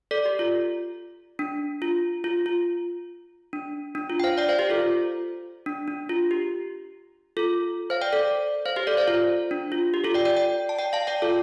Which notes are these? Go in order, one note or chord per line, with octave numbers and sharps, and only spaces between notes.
A4 D5
G4
F4
D4
F4
F4
F4
D4
D4
F4
G5
C5 F5
D5 G5
C5 F5
G4 C5
F4 A4
F4
D4
D4
F4
G4
F4 A4
C5 F5
D5 G5
A4 D5
C5 F5
G4 C5
A4 D5
C5 F5
F4
D4
F4
G4
F4 A4
D5 G5
D5 G5
D5 G5
A5
D5 G5
F5 A5
D5 G5
F4 A4